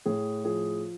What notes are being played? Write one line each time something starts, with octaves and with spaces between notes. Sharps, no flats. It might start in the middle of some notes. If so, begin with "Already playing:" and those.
A2 G#4
F3 G#4